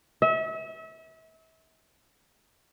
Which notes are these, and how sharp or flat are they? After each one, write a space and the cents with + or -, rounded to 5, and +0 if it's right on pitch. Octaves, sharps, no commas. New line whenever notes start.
E5 -35